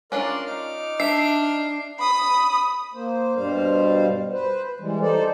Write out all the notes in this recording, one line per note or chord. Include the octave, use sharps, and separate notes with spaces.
C#4 D4 F4 A#4 D5 C6
D#4 D6 F6
D4 E5 C7
B5 D#6
A#3 C5
G2 B2 G3 C5 F5
B4 C5
E3 G3 G#3
D#4 A4 C5 D5